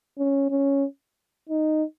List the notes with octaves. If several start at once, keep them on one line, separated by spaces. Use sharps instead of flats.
C#4
C#4
D#4